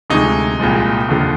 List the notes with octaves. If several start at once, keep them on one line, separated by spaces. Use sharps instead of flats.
D2 C3 F3 G#3 D#4
C2 A#2 F3 G#3
F1 D#2 D3 F3